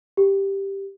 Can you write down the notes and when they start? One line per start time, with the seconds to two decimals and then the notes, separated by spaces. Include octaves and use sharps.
0.17 G4